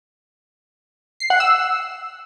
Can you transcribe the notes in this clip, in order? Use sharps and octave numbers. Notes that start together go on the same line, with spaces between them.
C7
F#5
E6